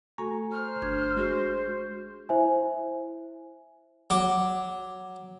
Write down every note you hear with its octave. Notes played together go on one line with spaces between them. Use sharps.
A3 F#4 A4 G#5 A#5 C#6
C5 F6
G1 D4 G#6
G#3 F#4 G#4
E4 C5 E5 G#5
F#3 D6